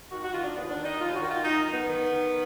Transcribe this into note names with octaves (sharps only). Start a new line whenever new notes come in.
D#3 F#4
F#4
D#3 F4
D4
D#2 B3
D4
D#3
D#4
D#2 F4
F#4
D#3
F4
F#2 D#4
D#3
B3
D#3
D#3